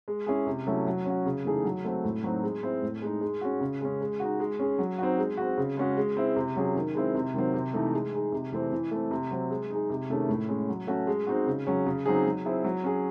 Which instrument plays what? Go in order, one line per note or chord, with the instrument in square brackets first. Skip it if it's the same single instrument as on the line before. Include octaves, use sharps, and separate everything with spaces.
[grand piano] G#3
C#4 E4 G#4
C3
F#3 A3 C#4 E4
F#3
C#4 F#4
C#3
E3 A3 D#4 G#4
F#3
A3 C4 F#4
A2
F#3 C4 D#4 F#4
G#3
C4 E4
A2
G#3 D#4
G#3
C#4 F#4
C#3
G#3 C#4
G#3
D#4 F#4
G#3
C#4 G#4
F#3
C4 D#4 F#4
G#3
C4 F#4
C#3
G#3 C#4 F#4
G#3
C4 E4
C3
F#3 C#4 G#4
D#3
G#3 C4 E4
C3
D#3 F#3 C4
C3
E3 A3 D#4
G#3
D#4 G#4
C3
E3 A3 C4
E3
A3 C4
C3
F#3 C4
G#3
D#4 G#4
C3
D#3 A3 C#4 G#4
A2
G#3 C#4
F#3
A3 C#4 F#4
G#3
C4 D#4 F#4
C#3
F#3 C#4 G#4
C#3
F#3 C4 D#4 G#4
F#3
C4 E4 G#4
F#3
C#4 G#4